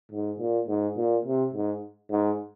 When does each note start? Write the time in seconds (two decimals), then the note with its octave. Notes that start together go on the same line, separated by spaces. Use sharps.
0.12 G#2
0.39 A#2
0.68 G#2
0.97 A#2
1.25 C3
1.54 G#2
2.11 G#2